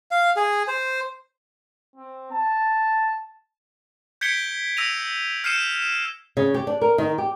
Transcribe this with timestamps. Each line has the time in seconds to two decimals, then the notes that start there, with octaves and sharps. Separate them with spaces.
0.11 F5
0.36 G#4
0.68 C5
1.96 C4
2.32 A5
4.21 G6 G#6 B6 C#7 D7 G7
4.77 E6 A#6 D#7 F7
5.44 F6 G6 C7 C#7 D#7 E7
6.37 C#3
6.54 G4
6.67 D4
6.81 A#4
6.98 D#3
7.18 G4